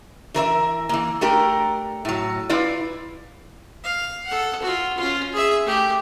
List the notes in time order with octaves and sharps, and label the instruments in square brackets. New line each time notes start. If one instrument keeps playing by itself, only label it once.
[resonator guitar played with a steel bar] E3 A#4 C5 E5
E3 A#3
A3 D4 G4 A#4
A2 F#3
E4 F4 B4 D5
[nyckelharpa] F5
A4 F#5
F4 F#4
C#4 F4
G#4 E5
A3 G4